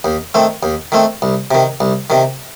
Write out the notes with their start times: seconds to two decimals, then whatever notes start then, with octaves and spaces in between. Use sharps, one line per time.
0.04 D#2
0.34 D#3 A3 C4
0.63 D#2
0.92 D#3 A3 C4
1.22 C2
1.51 C3 D#3
1.80 C2
2.10 C3 D#3